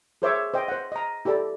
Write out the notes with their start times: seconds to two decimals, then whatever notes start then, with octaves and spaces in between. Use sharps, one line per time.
0.22 G#4 A#4 C5 C#5 E5 D6
0.54 C5 D#5 G5
0.68 C5 F#5
0.92 D#5 A#5
1.25 E4 G4 A4 D5